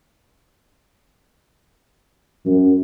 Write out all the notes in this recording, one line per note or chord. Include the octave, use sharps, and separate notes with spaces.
F#2